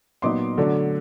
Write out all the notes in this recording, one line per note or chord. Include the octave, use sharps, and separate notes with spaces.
A#2 F#3 B3 D#4 C6 D6
D3 F#3 A3 D4